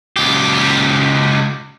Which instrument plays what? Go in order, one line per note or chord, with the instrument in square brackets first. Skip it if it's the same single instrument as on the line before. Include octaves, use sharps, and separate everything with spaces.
[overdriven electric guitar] C#2 G4